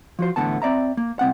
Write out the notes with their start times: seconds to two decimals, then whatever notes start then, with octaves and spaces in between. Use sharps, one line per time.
0.19 F3 F#4 C5
0.36 E2 A2 D3 F3 B3 A5
0.62 C4 D5 E5 A#5
0.97 A#3
1.19 C2 C4 F#5